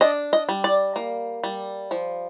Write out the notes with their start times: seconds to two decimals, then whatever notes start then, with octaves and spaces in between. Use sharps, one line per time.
0.01 D4 D#5
0.33 D#5
0.49 G3
0.64 D5
0.96 A#3
1.44 G3
1.91 F3